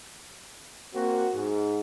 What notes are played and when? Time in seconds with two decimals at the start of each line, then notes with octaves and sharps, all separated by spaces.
0.93 A#3 C4 F#4
1.33 G#2